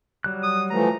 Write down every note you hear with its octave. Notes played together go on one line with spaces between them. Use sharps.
F#3 G3 F#6
D#6
E3 F3 A3 A#5